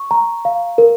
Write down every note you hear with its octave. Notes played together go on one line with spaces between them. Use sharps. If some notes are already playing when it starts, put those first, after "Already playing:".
Already playing: C#6
A#5
F5
A#4